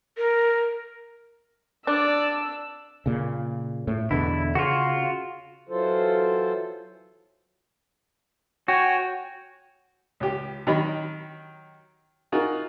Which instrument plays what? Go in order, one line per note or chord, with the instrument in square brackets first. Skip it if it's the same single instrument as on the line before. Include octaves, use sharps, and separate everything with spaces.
[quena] A#4
[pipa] D4 [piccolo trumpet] D5 [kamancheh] E6
[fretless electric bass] A#2 C#3
A2
[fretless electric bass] E2 B2 D3 [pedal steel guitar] E4
[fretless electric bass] C#3 [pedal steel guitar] F4 F#4
[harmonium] E3 F#3 F4 A4 C5
[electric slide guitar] F#4 [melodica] C#5 G5 G#5
[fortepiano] C#2 G4
D#3 F#3 D#4 G4 D#5 B5
D#4 F4 F#4 G#4 A#4 G#5